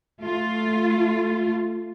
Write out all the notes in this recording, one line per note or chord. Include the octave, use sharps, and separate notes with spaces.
A3 F4